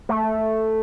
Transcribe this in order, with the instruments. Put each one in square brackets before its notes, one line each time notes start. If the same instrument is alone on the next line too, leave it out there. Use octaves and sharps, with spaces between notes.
[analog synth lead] A3